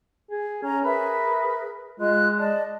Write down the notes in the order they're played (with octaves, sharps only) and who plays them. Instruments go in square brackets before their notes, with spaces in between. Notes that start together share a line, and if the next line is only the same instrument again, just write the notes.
[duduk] G#4
[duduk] C#4 [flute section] A#5
[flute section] G#4 A#4 E5 [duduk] B4
[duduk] G#3 [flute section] F4 D#5 F#6
[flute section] D5 D#5 A5